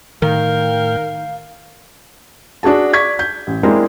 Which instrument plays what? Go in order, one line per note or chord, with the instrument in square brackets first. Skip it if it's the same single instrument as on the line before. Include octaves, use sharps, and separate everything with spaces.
[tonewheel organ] A2 G5 [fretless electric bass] D#3 [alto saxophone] A#4 [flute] F5
[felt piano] D4 F#4 G#4 A5
D5 C#6 G#6 B6
G6
A1
G#3 A#3 C4 D4 E4